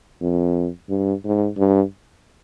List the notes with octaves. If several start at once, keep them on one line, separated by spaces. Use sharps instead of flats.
F2
G2
G#2
G2